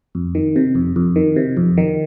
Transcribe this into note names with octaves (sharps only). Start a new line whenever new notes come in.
F2
D#3
C3
F2
F2
D#3
C3
F2
D#3